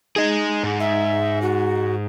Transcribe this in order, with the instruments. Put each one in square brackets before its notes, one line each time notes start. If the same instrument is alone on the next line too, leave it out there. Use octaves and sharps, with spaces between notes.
[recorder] D#4 [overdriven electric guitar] G#4 D#5
[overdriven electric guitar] G#2
[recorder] E5
F#4